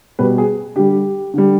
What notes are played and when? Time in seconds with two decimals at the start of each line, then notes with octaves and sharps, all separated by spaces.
0.19 B2 G3 B4
0.38 G#4
0.76 D3 G3 G4
1.34 D3 G3